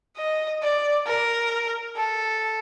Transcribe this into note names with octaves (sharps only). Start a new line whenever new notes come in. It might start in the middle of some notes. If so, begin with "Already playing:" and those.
D#5
D5
A#4
A4